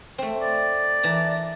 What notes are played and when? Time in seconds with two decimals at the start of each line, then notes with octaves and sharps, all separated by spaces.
0.18 A3 C4
0.40 D5
1.03 E3 A5 A#5